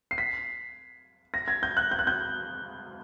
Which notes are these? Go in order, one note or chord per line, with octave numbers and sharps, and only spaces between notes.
C7
B6
A#6
G#6
G6
F#6
G6
F#6
G6